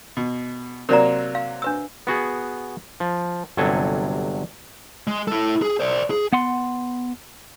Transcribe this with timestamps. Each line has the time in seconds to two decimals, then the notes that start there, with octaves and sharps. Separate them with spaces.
0.17 B2
0.89 C3 F#3 A#3 A#4 D5 A#5
1.35 F5
1.62 D4 B4 E6
2.07 B3 F#4 G#4
3.00 F3
3.57 G1 C3 F#3 A4 G#5
5.07 G#3
5.28 E4 A4
5.62 G#4
5.80 C5 D5
6.10 G#4
6.32 B3 F#5 C6